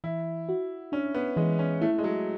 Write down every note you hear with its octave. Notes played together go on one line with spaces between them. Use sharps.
E3 E4
F#4
C#4 D4
B3
E3 G#3
C#4
A3 E4
G#3
F#3